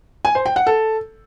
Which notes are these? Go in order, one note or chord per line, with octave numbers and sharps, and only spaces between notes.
G#5
C5
G5
F#5
A4